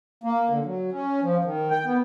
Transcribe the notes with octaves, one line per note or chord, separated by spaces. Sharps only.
A#3
D3
F#3
C#4
F3
D#3
G5
B3